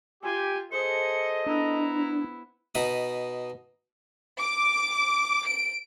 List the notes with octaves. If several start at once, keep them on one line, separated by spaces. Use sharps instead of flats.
F4 G4 G#5
G#4 A4 C5 D#5 C#7
B3 D4 E4 A#5
B2 D#4 B5 D#6
D6
D7